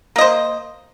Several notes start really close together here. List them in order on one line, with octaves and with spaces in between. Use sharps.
A#3 D#5 C5